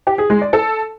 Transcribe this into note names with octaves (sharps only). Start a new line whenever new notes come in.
G4
G#4
G#3
D5
A4